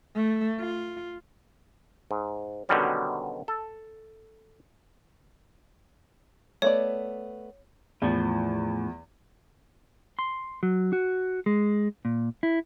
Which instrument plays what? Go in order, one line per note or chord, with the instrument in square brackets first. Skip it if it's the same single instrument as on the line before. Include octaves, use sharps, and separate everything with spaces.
[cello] A3
F4
[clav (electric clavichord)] G#2
B2 D3 D#3 F#3 G3 C#4
A4
[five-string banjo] A3 B3 D5 [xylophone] C#5
[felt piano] E2 [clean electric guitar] A2 F3
[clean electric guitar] C6
F#3
F#4
G#3
A#2
E4